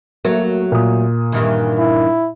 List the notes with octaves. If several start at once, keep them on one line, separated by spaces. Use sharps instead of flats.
F#3 A3 A#3
A#2 D#6
G2 D#3 E3
E4